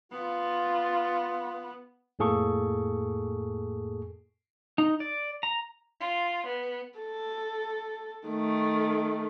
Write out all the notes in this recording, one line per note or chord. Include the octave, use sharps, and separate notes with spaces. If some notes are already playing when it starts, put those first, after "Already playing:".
B3 F4
F2 A2 A#3 G#4 A4 C#6
D#4
D5
A#5
F4
B3
A4
D#3 A3